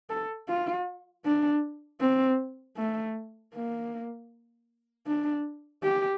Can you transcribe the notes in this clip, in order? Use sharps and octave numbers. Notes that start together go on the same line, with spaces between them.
A4
F4
D4
C4
A3
A#3
D4
G4